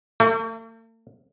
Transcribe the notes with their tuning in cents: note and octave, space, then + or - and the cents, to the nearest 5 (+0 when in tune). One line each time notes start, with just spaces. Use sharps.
A3 +45